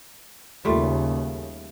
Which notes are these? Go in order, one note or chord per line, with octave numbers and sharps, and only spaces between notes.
D#2 C#3 G3 A3 F4